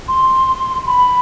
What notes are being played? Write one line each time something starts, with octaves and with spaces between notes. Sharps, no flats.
C6
B5